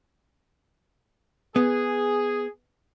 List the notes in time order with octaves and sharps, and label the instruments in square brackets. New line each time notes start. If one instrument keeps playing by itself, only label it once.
[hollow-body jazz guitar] B3 [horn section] G#4